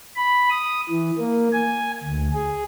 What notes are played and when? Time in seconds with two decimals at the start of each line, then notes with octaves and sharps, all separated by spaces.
0.16 B5
0.50 D#6
0.89 E3
1.18 A#3
1.53 G#5
2.03 D2
2.33 G#4